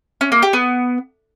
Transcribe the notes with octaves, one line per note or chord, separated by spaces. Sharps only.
C#4
A#3
G4
B3